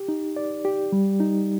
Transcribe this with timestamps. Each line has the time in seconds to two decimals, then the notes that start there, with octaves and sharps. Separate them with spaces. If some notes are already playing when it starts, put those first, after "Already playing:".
Already playing: G4
0.08 D#4
0.36 D5
0.65 G4
0.92 G3
1.20 D#4